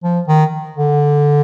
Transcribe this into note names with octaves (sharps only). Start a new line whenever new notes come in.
F3
D#3
D3